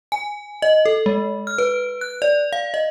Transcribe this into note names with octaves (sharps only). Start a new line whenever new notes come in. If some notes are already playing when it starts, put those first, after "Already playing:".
G#5
D#5
A4
G#3
F6
B4
F#6
D5
F5
D#5